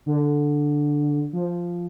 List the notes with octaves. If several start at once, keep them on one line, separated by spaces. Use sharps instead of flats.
D3
F3